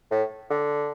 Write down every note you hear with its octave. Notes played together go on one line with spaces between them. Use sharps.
A2
D3